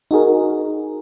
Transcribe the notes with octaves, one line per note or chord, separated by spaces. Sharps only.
D#4 F#4 G#4 A#4